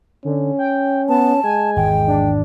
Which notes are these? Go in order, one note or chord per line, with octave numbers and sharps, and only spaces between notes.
D3 C#4
G5
B3 A5
G#3 G#5
G#1 E2 G5
D4